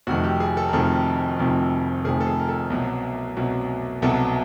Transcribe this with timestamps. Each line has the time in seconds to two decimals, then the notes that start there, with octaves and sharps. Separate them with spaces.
0.07 F1 F2 C3 D#3 F#4
0.24 G4
0.40 G#4
0.57 A4
0.68 A#4
0.73 F1 F2 C3 D#3 A4
1.39 F1 F2 C3 D#3
2.05 F1 F2 C3 D#3 G#4
2.21 A4
2.27 G#4
2.40 A#4
2.49 A4
2.70 C2 B2 F#3
3.37 C2 B2 F#3
4.02 C2 B2 F#3 A4